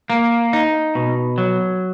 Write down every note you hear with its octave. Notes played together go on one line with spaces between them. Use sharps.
A#3
D#4
B2
F#3